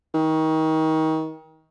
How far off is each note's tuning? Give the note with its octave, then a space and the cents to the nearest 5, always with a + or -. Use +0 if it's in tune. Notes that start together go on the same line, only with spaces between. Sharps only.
D#3 +30